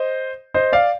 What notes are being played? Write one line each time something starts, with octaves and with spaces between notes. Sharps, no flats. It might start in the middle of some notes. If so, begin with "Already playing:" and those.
Already playing: C5 D#5
C5 D#5
D5 F5